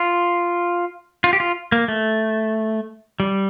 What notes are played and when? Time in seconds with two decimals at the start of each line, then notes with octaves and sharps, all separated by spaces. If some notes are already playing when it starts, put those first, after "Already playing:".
Already playing: F4
1.24 F4
1.33 G4
1.40 F4
1.72 A#3
1.88 A3
3.20 G3